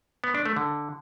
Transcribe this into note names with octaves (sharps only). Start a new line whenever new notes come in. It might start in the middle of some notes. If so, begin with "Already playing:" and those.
B3
D4
A3
D3